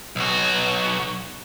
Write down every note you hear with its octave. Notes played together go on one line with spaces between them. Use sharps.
B1 F#4